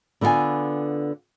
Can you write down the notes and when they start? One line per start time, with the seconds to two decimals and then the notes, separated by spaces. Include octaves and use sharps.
0.21 D3 B3 F4 E5 G#5